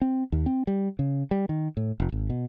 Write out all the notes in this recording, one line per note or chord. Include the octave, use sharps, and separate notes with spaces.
C4
D#2
C4
G3
C#3
G3
D#3
A2
F1
G#1
B2